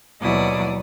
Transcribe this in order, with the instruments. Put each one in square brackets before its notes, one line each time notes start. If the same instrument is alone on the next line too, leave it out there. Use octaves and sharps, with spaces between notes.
[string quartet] D#2 B2 F#3 E4 D5 D#6